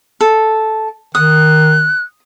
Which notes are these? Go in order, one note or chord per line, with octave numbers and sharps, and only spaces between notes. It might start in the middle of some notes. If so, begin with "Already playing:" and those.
A4
D#3 D#6 F#6